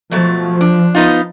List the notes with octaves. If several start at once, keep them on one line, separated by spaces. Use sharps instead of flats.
B2 F3 F#3 A3
D4
B3 D#4 F4